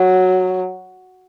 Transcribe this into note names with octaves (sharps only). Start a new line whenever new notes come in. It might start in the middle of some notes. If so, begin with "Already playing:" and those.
Already playing: F#3